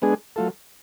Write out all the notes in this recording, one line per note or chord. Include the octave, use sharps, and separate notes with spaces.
G#3 B3 D4 G#4
F#3 A3 F4 A4